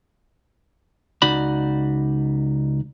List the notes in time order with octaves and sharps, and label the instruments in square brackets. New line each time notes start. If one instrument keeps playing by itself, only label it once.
[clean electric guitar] C#2 D#4 F#4 D5 B5